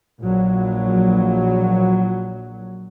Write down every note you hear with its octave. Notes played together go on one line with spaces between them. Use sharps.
A#1 F#3